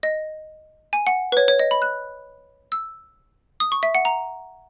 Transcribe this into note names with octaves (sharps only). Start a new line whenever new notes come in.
D#5
G#5
F#5
B4
C#5
C#5
D#5
B5
F#6
E6
D#6
C#6
E5
F#5
A#5